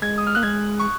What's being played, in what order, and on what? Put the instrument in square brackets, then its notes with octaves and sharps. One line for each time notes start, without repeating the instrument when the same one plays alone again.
[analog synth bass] G#3 [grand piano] G#6
[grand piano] D#6
F6
[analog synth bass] A#3 [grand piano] F#6
[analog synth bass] G#3 [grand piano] G#6
[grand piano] C#6